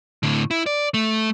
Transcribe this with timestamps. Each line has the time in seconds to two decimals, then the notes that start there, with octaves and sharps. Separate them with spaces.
0.23 A2 D3
0.51 E4
0.66 D5
0.94 A3